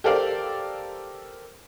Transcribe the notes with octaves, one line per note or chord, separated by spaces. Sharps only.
G4 A4 A#4 C5 D5 F5